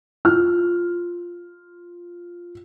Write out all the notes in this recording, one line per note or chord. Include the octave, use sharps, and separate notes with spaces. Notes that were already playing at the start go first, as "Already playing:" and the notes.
F4 F6